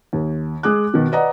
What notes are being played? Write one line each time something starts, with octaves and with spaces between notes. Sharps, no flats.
D#2
G#3 G#4 D6 F#6
B2 D#3
B4 D5 D#5 F#5 A#5